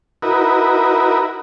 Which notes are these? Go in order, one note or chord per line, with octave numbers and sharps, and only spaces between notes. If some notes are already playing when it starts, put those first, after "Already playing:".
D#4 E4 F#4 A#4 B4